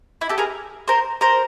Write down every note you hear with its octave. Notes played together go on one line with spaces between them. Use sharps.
E4
G4 A4
G#4 A#4
A#4 C5
A#4 C5